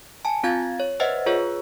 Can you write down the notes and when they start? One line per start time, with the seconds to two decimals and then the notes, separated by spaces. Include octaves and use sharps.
0.25 G#5 A5
0.43 C4 F4 F5 G#6 A6
0.80 C#5
1.00 B4 C5 D#5 E5 F#5
1.26 F4 G#4 B4 C#5